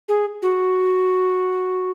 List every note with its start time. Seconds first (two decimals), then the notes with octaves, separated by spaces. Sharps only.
0.09 G#4
0.42 F#4